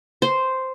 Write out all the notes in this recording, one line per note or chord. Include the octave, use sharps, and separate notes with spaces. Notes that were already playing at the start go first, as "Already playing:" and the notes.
C5